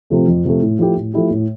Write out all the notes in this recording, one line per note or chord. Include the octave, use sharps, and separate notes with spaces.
C3 F3 A3
F2
C3 F3 A3
A2
F3 A3 E4 G4
A2
F3 A3 E4 G4
A2